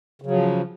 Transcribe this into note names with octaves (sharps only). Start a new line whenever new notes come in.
C#3 F3 F#3